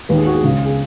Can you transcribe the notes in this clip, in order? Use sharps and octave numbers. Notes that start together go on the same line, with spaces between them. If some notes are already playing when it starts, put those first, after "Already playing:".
D#2 D#3 B4
G#4
F#4
G#4
C#2 C#3
G#4